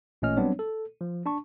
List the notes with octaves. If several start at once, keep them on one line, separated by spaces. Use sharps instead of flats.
A1 A#2 A3 C#4 D#5 F6
F#3 G3 B3 C4 D4 C#5
A4
F3
D4 A5 C#6